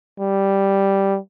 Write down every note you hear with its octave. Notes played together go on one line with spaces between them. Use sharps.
G3